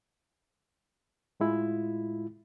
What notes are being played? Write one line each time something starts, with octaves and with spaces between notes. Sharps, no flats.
A2 G#3 E4 F4